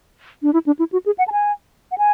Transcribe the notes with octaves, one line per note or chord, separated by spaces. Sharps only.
D4
E4
D4
E4
F#4
G#4
F#5
A5
G#5
F#5
G#5